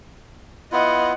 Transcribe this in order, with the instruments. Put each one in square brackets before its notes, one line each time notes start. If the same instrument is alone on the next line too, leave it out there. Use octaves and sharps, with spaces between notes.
[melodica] B3 E4 F4 [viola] D#5 F#5